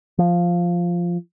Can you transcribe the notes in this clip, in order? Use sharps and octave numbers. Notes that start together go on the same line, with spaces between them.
F3